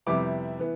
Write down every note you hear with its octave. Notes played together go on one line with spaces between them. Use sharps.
F2 C3 G3 B3 E4 D6
E3 B3